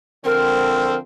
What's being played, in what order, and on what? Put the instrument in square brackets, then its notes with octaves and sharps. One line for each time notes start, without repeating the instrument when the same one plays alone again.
[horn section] D3 F3 C4 [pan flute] A#4